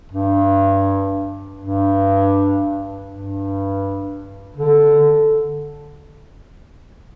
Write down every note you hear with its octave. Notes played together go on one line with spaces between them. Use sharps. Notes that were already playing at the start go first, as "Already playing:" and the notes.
G2
G2
G2
D3